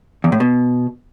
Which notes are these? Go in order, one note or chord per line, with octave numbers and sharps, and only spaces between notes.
E2
A2
B2